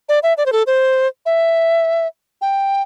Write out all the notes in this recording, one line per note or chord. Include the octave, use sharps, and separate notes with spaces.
D5
E5
D5
C5
A4
C5
E5
G5